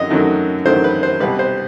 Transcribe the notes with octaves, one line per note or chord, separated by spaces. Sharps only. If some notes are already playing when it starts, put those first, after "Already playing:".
Already playing: F#2 D#3 F#3 D#5
F#2 D#3 F#3 A3
F#2 D#3 F#3 A3 C5
B4
C5
C2 B2 G3 B4
C5